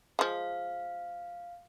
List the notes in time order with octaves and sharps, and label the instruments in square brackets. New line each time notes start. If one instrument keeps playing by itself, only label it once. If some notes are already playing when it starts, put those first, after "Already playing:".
[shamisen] F3 G#3 [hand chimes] F5